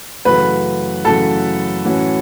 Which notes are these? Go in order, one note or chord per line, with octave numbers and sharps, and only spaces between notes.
F#2 C#3 E3 A3 F#4 B4
F#2 C#3 E3 A3 F#4 A4
A2 E3 C#4 F#4